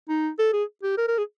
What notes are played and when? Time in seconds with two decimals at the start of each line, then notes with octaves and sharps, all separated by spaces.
0.09 D#4
0.39 A4
0.53 G#4
0.83 G4
0.97 A#4
1.07 A#4
1.18 G#4